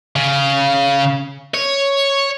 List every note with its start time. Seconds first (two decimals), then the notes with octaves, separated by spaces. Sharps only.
0.16 C#3
1.54 C#5